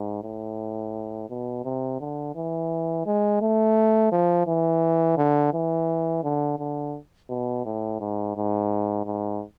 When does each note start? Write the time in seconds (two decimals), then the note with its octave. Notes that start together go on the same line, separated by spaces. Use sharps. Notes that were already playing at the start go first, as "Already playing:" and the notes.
Already playing: G#2
0.23 A2
1.30 B2
1.65 C3
2.00 D3
2.36 E3
3.06 G#3
3.42 A3
4.12 F3
4.47 E3
5.18 D3
5.54 E3
6.24 D3
6.59 D3
7.30 B2
7.65 A2
8.01 G#2
8.36 G#2
9.06 G#2